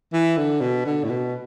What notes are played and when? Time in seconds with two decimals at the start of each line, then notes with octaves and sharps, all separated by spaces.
0.13 E3
0.37 D3
0.61 B2
0.86 D3
1.04 A2
1.09 B2